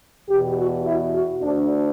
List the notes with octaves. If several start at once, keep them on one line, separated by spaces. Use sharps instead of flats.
E2 B2 G4
F#4
E4
F#4
D2 D3 D4